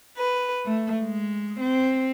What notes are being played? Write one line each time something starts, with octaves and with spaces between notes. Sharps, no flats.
B4
A3
G#3
C4